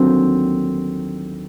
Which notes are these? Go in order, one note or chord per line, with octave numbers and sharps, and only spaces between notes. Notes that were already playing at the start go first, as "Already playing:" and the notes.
Already playing: D#2 D3 F#3 C4